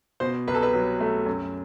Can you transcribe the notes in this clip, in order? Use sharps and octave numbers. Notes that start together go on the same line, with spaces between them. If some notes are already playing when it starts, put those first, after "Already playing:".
B2 C5
C2 B4
A4
B4
F#3
A3
F#2